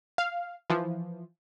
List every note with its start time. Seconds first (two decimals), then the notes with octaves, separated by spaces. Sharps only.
0.18 F5
0.70 E3 F3